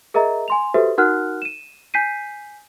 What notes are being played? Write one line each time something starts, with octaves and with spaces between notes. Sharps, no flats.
G#4 A#4 D#5 E5 A#5
G#5 C6 F7
F#4 G4 A4 B4 C5 E5
D#4 F#4 A#4 F#5 F6 F#6
D#7 E7
G#5 G6 B6 C7 D#7